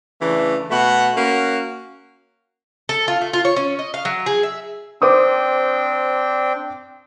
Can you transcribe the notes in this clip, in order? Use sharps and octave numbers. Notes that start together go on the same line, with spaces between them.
C#3 E3 A3 D4
B2 A3 F#4 F#5
A#3 C#4 F#4
A4
F4
A3
F4
C#5
C#4
D#5
F5
F#3
G#4
E5
C4 D4 C5 G5 D6 D#6